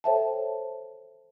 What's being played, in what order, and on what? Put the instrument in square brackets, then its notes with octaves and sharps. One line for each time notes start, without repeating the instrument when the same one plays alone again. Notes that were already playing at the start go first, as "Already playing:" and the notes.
[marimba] A4 C5 C#5 E5 G5 A5